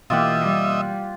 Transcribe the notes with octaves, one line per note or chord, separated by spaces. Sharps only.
B2 E3 A#3 F4 G4 D#5 E5 F#5
G3